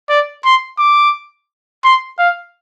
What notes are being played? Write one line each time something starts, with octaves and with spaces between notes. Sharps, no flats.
D5
C6
D6
C6
F5